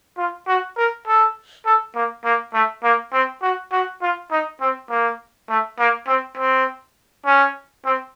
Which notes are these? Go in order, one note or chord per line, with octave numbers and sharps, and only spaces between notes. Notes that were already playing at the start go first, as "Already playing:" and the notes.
F4
F#4
A#4
A4
A4
A#3
A#3
A3
A#3
C4
F#4
F#4
F4
D#4
C4
A#3
A3
A#3
C4
C4
C#4
C4